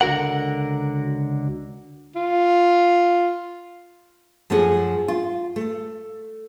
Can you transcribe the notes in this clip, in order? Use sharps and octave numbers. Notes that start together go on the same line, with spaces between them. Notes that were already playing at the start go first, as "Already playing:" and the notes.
C#2 D3 F#4 A#4 F#5
F4
F#2 F3 A3 C#4 G#4
F4
A3